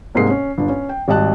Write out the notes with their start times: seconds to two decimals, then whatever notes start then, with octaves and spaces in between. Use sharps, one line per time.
0.15 C2 G#2 G#3 A#3 C7
0.30 C#4
0.58 G1 D4
0.69 C#4
0.89 G5
1.08 G#1 G3 D#5 A5 F#6